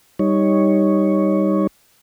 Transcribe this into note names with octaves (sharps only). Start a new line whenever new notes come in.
G3 D#4 C#5